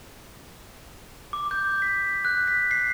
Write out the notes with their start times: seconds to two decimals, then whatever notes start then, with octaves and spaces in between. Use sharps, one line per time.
1.33 D6
1.51 G6
1.82 B6
2.25 F#6
2.48 B6
2.71 C7